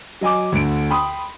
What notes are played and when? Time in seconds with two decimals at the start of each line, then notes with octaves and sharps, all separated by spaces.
0.21 F#3 D#5 G#5 D6
0.52 D2 D3 D7
0.90 G5 B5 C6 D#6